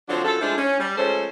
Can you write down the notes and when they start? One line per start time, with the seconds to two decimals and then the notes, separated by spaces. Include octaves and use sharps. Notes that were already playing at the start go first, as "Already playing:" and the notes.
0.09 D3 F3 F#3 C4 D4
0.25 F#2 F#3 F4 A4
0.41 F3 G#3 A3 D4 E4
0.58 C#4
0.80 G3
0.98 F3 G#3 A3 C#4 A4 C5